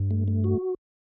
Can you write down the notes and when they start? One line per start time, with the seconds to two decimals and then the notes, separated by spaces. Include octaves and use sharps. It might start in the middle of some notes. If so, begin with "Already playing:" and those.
Already playing: G2
0.11 A3
0.28 A3
0.44 F#4